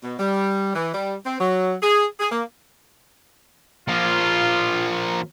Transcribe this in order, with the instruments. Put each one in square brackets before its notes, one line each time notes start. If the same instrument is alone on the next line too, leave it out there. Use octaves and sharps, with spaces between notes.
[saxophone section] B2
G3
E3
G3
C4
F#3
G#4
G#4
A#3
[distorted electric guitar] F3 A#3 [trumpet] F4